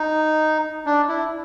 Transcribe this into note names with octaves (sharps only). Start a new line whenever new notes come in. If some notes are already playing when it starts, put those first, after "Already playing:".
Already playing: D#4
D4
E4